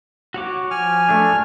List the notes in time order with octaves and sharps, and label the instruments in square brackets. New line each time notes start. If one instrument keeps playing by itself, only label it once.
[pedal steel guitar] F#4 C#5 D6
[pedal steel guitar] F3 [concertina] G#5 F6
[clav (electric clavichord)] A3 D4